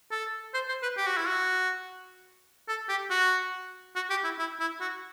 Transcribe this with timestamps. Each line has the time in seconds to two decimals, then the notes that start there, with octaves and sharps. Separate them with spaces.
0.11 A4
0.54 C5
0.68 C5
0.82 B4
0.97 G4
1.06 F#4
1.17 E4
1.27 F#4
2.68 A4
2.89 G4
3.10 F#4
3.95 F#4
4.10 G4
4.24 E4
4.39 E4
4.60 E4
4.81 F#4